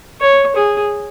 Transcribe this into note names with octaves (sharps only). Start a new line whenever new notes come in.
C#5
G#4